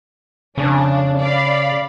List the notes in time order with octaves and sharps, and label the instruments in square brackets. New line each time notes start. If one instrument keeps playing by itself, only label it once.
[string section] F2 D4 [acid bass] C#3
[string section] D5 F5 B5